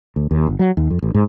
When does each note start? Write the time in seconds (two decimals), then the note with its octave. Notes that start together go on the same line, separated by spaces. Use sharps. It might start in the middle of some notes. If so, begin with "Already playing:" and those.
0.16 D2
0.31 D#2
0.47 G1
0.59 F#3
0.77 D#2
0.90 F2
1.02 A1
1.14 G#2